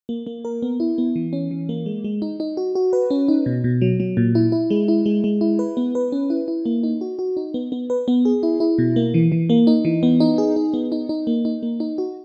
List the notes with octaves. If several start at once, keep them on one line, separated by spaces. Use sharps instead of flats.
A#3
A#3
A#4
B3
E4
B3
E3
C#4
E3
A#3
G#3
G#3
D#4
D#4
F#4
F#4
B4
C#4
D#4
B2
B2
F#3
F#3
A#2
E4
E4
G#3
E4
G#3
G#3
E4
B4
B3
B4
C#4
E4
E4
A#3
D#4
F#4
F#4
D#4
B3
B3
B4
B3
G#4
E4
E4
B2
A#3
E3
E3
A#3
D#4
E3
B3
D#4
G#4
D#4
B3
D#4
D#4
A#3
D#4
A#3
D#4
F#4